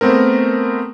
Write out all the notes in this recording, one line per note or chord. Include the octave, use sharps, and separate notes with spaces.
A3 B3 C4 A#4